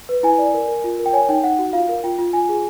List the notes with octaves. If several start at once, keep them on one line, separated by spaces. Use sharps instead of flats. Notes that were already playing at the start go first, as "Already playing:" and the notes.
B4
E4 G#5
D5
A#4
A#4
F4
A#4
G5
C#5 G#5
D#4 G5
D#4 F#5
F#4
F4 F5
A#4
F4 G5
F4
F4 G#5
G#4